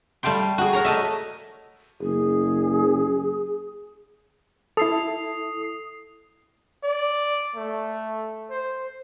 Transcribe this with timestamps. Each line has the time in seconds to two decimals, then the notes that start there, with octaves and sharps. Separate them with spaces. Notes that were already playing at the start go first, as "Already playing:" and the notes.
0.23 G3 A3 F5 G5 C6
0.58 F#4 G#4
0.73 A#4 C#5 A#5
0.85 A3 D#5 E5
2.01 F#1 G#4
4.77 E4 A4 D#6 C7
6.83 D5
7.55 A3
8.50 C5